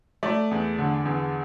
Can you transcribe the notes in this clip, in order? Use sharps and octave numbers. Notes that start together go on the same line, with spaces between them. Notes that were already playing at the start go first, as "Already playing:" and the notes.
A3 D5
E2
D3
E2